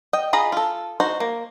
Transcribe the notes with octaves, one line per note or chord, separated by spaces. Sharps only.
D#5 G5
F4 G#4 D#5 A#5 B5
F4 A4
D#4 F#4 C5
A#3